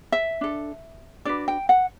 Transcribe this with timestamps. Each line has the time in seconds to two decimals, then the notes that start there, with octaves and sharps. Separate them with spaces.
0.12 E5
0.41 D4 A4
1.25 D4 F#4 B4 D5
1.48 G5
1.69 F#5